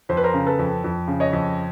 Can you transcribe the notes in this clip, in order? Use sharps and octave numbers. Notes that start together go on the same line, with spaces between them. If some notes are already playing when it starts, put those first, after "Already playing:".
F2 C5
B4
A#4 C5
C#3
A4 B4
F2
F2
C#3
C#5 D#5
F2